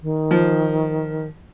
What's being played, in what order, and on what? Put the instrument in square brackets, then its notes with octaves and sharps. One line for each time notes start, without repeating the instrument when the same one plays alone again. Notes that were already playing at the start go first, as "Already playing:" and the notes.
[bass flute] D#3
[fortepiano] F3